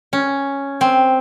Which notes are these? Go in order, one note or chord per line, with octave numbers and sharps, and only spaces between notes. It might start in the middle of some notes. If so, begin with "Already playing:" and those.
C#4
C4